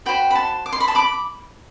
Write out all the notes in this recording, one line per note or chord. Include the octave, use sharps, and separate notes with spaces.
F#4 C5 G5 B5
B5
A5 C6
D6
C6
B5
A5 C6
B5 D6